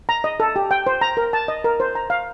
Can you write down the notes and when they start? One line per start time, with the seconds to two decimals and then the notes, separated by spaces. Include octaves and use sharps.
0.09 A#5
0.24 D#5
0.40 A4
0.56 G4
0.71 G5
0.87 C5
1.01 A#5
1.17 A#4
1.33 A5
1.48 D#5
1.64 A#4
1.80 C5
1.95 A#5
2.10 F5